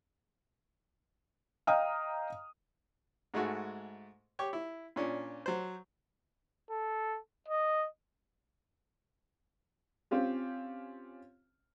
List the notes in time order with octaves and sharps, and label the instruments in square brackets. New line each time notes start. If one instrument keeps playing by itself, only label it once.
[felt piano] D#5 F5 G5 A#5 D#6 F6
[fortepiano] G#2 G#3 A3 F#4
G4 C#5 C#6
E4
A#2 C#4 D4
F#3 C5
[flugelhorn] A4
D#5
[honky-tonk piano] C4 C#4 F4 G4